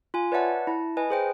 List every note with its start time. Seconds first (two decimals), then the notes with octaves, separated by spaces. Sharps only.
0.14 F4 G#5
0.32 B4 C#5 D5 E5 F#5 A5
0.67 E4 A5
0.97 B4 D#5 G#5
1.10 G#4 C5 G5